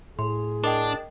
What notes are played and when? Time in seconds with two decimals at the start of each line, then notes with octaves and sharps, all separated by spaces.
0.19 A2 G#4 C6
0.64 D4 A#4 D#5 G5